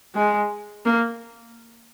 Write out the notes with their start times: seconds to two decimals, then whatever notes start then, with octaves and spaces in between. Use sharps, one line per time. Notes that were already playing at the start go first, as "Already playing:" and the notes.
0.15 G#3
0.85 A#3